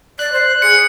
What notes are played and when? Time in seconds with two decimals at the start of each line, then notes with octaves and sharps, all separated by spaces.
0.19 D5 F#6
0.33 C5
0.62 G#4 C#7